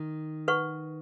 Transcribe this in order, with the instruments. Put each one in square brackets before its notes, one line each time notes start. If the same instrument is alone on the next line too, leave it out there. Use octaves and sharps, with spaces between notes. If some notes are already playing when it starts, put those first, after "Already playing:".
Already playing: [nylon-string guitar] D#3
[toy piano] B4 F#5 C#6